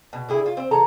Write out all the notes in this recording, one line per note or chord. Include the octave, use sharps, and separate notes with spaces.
B2
D3 E4 G#4
F4
C4 C5
E3 A4 A#5